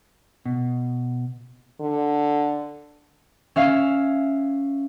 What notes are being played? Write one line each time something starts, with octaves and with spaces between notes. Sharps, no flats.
B2
D3
C#4 E5 F5